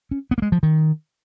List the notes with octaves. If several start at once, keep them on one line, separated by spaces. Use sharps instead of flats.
C#4
B3
A#3
G#3
F3
D#3